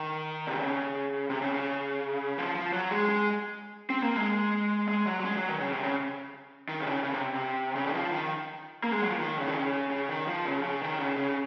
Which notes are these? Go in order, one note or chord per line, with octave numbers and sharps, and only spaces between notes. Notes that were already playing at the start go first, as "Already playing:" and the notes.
Already playing: D#3
C3
C#3
C3
C#3
C#3
F3
F3
F#3
G#3
G#3
C4
A#3
G#3
G#3
F#3
F#3
G#3
F#3
D#3
C#3
C3
C#3
D#3
C3
C#3
C#3
C3
C3
C#3
D#3
F3
D#3
A#3
G#3
F#3
F3
D#3
C#3
D#3
C#3
C#3
D#3
F3
C#3
C#3
D#3
C#3
C#3